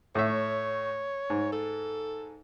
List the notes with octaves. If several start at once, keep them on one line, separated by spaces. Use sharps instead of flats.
A2 C#5 E5
G#2
A4